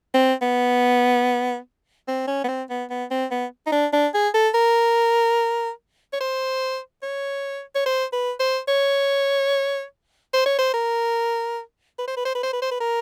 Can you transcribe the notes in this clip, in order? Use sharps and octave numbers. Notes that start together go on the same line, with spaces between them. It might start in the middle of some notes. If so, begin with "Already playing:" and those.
C4
B3
C4
C#4
B3
C4
B3
B3
C4
B3
D#4
D4
D4
G#4
A4
A#4
C#5
C5
C#5
C#5
C5
B4
C5
C#5
C5
C#5
C5
A#4
B4
C5
B4
C5
B4
C5
B4
C5
B4
A#4